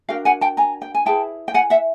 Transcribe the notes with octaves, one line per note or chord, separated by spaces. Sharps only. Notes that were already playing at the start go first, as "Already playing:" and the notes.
D4 F#4 A#4 F5 G5
F#5 G#5
G5 A5
G#5 A#5
G5
G#5
E4 G#4 B4 G5 A5
G5
F#5 G#5
E5 F#5